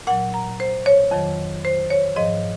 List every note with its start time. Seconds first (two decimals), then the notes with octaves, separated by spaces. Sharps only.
0.07 A#2 F#3 F#5
0.34 A#5
0.60 C5
0.86 C#5
1.11 F2 D#3 F#3
1.65 C5
1.90 C#5
2.16 G#2 F3 D#5